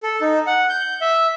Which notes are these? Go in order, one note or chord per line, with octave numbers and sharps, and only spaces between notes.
A4
D#4
F#5
G6
E5